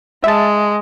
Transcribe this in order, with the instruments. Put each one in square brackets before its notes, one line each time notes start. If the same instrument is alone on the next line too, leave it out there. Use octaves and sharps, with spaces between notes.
[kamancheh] G#3 [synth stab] E5 A5